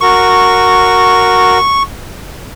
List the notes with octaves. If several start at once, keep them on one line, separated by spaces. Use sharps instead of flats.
F#4 A#4 C#6